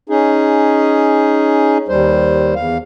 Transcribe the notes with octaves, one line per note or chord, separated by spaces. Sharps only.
C#4 D#4 G#4
D#2 G3 C5
E2 F5